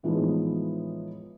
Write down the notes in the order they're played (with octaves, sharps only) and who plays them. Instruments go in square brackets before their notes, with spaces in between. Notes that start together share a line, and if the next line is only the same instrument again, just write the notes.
[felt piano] A2 E3 F3 G#3 B3 D#4